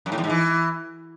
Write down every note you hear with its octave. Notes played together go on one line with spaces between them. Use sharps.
F#2
A2
E2
G#2
E3